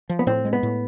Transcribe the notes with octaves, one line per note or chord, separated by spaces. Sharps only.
F3
B3
A2 C4
G#3
B3
A2